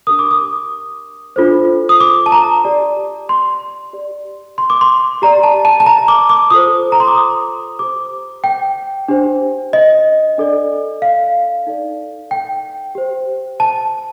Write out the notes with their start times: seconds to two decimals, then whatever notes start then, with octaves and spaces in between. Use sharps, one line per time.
0.07 D4 G4 A#4 D#6
0.19 D6
0.31 D#6
1.36 D4 F4 A4 C5
1.89 D#6
2.00 D6
2.26 A5
2.32 A#5
2.65 G4 D5
3.29 C6
3.93 G4 D5
4.58 C6
4.70 D6
4.81 C6
5.22 G4 D5 A#5
5.43 A5
5.65 A5
5.80 A5
5.86 A#5
6.08 D6
6.29 D6
6.50 F4 A4 C5 D#6
6.92 A#5
7.00 C6
7.08 D6
7.15 D#6
7.79 G4 C5 D6
8.44 G5
9.08 D4 G4 C5
9.73 D#5
10.38 D4 A4 D5
11.02 F5
11.67 D#4 A4 D5
12.31 G5
12.95 G4 C5
13.60 A5